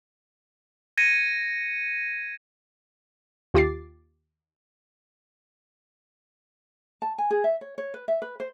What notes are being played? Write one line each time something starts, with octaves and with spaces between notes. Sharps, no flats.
G#6 A#6 C#7 D#7
D#2 F4 G4 D6 A6 C7
A5
G#5
G#4
E5
C#5
C#5
B4
E5
B4
C5